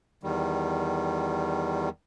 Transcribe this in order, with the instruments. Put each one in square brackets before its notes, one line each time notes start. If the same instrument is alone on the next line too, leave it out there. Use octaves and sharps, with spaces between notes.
[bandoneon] E2 D#3 G3